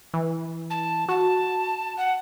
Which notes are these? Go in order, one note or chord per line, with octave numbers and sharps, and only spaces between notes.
E3
A5
F#4 A5
F#5